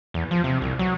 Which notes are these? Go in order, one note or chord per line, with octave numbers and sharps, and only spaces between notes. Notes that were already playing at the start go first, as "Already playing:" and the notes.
E2
F3
C3
C2
F#3